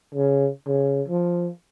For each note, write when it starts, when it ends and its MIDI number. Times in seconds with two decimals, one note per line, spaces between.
0.15 0.49 49
0.67 1.02 49
1.08 1.50 53